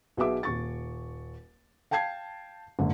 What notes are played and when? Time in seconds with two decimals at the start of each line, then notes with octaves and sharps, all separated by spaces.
0.17 B1 B2 G#4 E5 D6
0.43 D#1 C#6 A6
1.91 F5 G5 A5 G#6 C7
2.79 F#1 G#2 D3